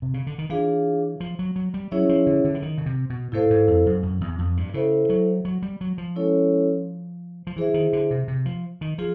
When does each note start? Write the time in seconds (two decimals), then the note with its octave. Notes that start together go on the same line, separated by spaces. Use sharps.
0.02 C3
0.14 C#3
0.27 D3
0.38 D#3
0.50 E3 D4 F4 G#4 C#5 F5
1.20 F3
1.39 F#3
1.56 F#3
1.74 G3
1.91 F#3 C#4 E4 G#4 C#5 E5
2.09 F3
2.27 D3
2.44 D3
2.55 E3
2.62 D#3
2.78 C#3
2.86 C3
3.10 B2
3.32 A2 E4 A4 C5 F5
3.50 G#2
3.68 F2
3.86 F#2
4.03 F#2
4.21 E2
4.39 F2
4.57 G2
4.74 C#3 E4 A4 C5 E5
5.09 F#3
5.45 F#3
5.62 G3
5.81 F#3
5.98 F3
6.16 G#3 C#4 E4 A4 C#5
7.47 F3
7.56 E3 E4 G#4 C5 E5
7.74 D#3
7.93 D3
8.11 C3
8.28 C3
8.45 F3
8.81 D#3
8.98 F3 F4 G#4